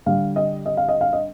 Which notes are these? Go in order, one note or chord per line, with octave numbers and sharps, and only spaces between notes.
D3 G3 F5
D#5
D#5
F5
D#5
F5
D#5